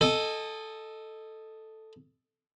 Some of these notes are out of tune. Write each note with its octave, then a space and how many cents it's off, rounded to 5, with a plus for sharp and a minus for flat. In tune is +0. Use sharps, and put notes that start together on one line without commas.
A4 +0 D#5 +0 G#5 -35